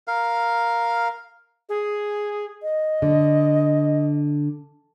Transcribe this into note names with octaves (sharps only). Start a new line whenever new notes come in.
A#4 F5
G#4
D#5
D3